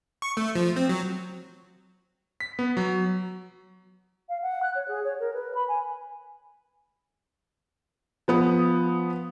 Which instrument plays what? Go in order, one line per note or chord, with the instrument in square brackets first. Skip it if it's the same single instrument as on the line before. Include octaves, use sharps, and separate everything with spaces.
[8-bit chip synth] C#6
A3
F3
C4
F#3
[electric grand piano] B6
B3
F#3
[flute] F5
F#5
F#6
C#5
G#4
C#5
A#4
B4
B5
G#5
[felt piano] F3 B3 D#6